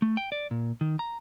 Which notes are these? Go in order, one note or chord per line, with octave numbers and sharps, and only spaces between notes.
A3
G5
D5
A#2
D#3
A#5